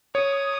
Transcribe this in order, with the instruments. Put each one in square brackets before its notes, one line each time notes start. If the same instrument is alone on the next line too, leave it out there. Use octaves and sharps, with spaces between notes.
[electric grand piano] C#5 [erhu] D#6